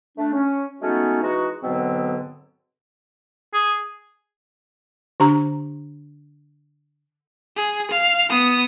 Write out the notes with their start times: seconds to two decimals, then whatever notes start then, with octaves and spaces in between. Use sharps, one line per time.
0.17 A3 D4
0.33 C#4
0.81 G#3 A3 B3 C#4 D#4 F#4
1.22 E3 G#3 D#4 F#4
1.62 G#2 B2 D3 F#3 B3 C4
3.54 G#4
5.20 D3 D4 G4 A#5
7.57 G#4
7.91 F5
8.29 B3 D#6